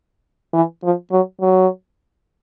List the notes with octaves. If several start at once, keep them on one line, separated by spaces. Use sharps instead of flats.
E3
F3
F#3
F#3